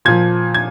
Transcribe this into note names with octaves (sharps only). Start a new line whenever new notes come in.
A#2 F3 G#6
G#6